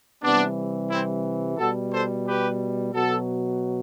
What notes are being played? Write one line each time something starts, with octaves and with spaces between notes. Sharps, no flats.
C3 E3 G3 B3 D4
C4 E4
B2 G3 F#4 A4
A4 C5
G4 B4
B2 F#3 F#4 A4